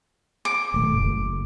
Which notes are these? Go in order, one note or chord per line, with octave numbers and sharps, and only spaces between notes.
D6
D#1 A3
F#1